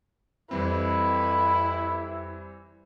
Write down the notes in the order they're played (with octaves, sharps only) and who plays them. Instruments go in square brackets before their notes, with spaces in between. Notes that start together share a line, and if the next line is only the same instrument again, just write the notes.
[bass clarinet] F2 [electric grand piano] E3 G3 C4 [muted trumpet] E4 [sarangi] B4